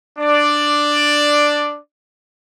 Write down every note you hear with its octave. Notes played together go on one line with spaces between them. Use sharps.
D4 D5